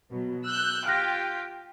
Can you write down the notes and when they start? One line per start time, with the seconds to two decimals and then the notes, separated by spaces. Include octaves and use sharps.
0.10 B2 F#3
0.46 E6 F#6 G6
0.86 F4 G4 G5 F6 F#6 A#6